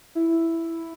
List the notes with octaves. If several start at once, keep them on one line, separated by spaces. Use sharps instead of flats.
E4